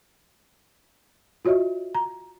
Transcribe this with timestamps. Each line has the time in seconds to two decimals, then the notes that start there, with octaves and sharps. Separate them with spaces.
1.45 F4 F#4 C#5 D#5 E5
1.95 A#5